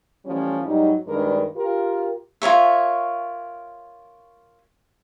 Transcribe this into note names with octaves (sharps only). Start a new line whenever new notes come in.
E3 F3 G3 A3 C#4
G#2 F#3 G3 D#4
G2 D#3 G#3 D4 A#4 B4
F4 G4 A#4
F4 A#4 C#5 E5